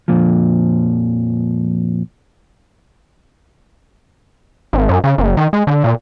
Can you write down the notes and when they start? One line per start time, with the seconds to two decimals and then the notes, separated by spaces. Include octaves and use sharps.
0.08 F2 A#2 F3
4.73 G#1
4.89 F#2
5.04 C#3
5.18 F#1
5.37 D#3
5.53 G#3
5.67 D3
5.84 A#2